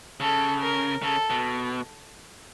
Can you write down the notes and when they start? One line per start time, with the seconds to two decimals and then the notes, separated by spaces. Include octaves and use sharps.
0.20 C#3 A4
0.62 A#4
1.02 C#3 A4
1.30 B2